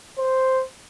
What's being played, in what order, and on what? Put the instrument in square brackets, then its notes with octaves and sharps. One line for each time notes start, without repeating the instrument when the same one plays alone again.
[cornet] C5